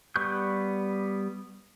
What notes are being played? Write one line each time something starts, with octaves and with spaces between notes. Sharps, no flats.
G3 B3 C#6 F#6 G6